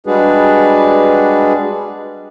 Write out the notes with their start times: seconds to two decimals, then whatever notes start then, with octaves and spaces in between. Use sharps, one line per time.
0.07 G3 G#3 D4 F#4 G#4 B4